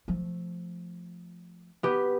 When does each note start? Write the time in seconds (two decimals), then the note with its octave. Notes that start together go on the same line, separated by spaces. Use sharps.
0.08 F3 A3
1.83 B3 G4